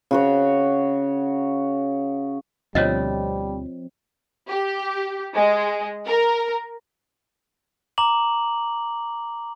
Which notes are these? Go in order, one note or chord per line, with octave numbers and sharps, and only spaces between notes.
C#3 F#4 C#5
D2 B2 F3 G3 C4 C#5 D#5
G4
G#3
A#4
A#5 D6 F#7